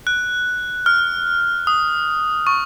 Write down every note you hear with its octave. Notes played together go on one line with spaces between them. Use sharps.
F#6
F6
D#6
C#6